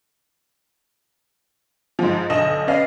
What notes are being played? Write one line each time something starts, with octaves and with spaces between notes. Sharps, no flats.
G#2 F3
B1 D3 A4 D#5 E7
C#4 B4 D5 D#5 F5